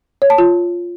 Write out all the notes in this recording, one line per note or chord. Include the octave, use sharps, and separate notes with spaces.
C#5
A5
F4